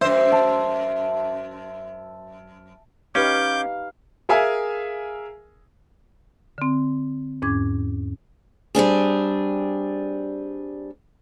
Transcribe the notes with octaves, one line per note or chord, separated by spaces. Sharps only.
F#2 C5 E5
A5
C#4 D#4 G4 B4 F5 D6 G6
G#4 A#4 E5 F5 G#5
D3 C4
E2 G#2 C#4 D6 G#6
G3 C4 D4 G#4